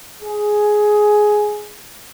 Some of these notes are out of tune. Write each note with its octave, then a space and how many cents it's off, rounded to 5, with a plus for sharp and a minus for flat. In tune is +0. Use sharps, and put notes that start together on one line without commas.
G#4 +10